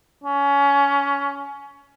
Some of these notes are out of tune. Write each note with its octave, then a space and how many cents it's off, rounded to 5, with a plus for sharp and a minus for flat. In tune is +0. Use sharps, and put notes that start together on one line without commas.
C#4 +20